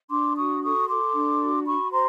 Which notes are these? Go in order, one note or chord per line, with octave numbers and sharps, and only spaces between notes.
D4 C6 D6
F#4 C#6 D#6
A4 C#6 D#6
A4 C6 D6
D4
F#4
F#4 B5 C#6
C5 A#5 C6